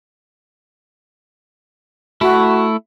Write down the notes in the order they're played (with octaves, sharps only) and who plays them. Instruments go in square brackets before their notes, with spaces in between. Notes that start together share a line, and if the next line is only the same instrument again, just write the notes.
[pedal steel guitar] A3 E4 [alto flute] F#4